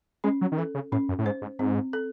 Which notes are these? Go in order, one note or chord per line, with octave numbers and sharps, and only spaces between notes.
G#3 C#4
F#3
D#3
E3 A4
C#3
A2 C#4
F#2
A2
G#2 C5
G#2
G#2 C4
A4